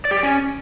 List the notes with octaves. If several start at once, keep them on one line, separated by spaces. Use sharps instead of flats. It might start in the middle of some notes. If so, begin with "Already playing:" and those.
D5
G4
D5
C#4